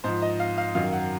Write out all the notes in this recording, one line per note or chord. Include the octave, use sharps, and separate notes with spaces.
G#2 F3 C5
D#5
F5
F5
F#2 D#3 F#3 F5
F#5